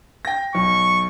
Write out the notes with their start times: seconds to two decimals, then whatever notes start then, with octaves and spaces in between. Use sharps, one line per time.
0.25 G5 A#6
0.55 B1 C#6